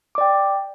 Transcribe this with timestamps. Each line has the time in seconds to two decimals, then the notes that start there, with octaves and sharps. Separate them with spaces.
0.15 D6
0.18 D5
0.21 G5